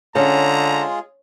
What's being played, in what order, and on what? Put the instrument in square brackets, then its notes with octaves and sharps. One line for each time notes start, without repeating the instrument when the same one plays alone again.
[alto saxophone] D3 [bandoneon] G#3 F4 G#4 [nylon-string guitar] C#4 [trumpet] A#5